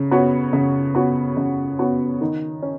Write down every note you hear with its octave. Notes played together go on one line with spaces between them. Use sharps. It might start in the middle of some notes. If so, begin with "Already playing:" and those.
Already playing: C#3 C#5
B3 F#4 C#5
C#3
B3 F#4 C#5
C#3
B3 F#4 C#5
D#3
C#4